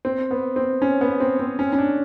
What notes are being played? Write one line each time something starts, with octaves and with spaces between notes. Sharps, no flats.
C4
B3
C4
C#4
B3
C4
C4
C#4
C#4
D4